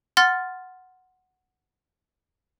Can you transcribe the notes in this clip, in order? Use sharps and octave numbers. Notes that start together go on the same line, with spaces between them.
F#5 C6 F6 A6